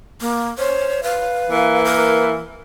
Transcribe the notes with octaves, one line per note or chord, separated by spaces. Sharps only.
A#3
C5 C#5
B4 F5
E3 A#3
A#4